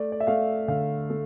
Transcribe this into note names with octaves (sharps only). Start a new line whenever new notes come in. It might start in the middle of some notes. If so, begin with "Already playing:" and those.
Already playing: A3 D5
D5
E5
A3 F5
D3 F5
A3